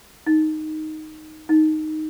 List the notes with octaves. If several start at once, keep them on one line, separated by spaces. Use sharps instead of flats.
D#4
D#4